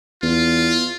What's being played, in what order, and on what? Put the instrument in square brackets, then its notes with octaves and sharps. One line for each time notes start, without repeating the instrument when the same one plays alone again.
[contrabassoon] E2 [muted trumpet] F4